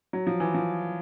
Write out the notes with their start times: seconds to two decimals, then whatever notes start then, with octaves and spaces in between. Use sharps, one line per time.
0.13 F#3
0.27 F3
0.40 E3
0.54 F3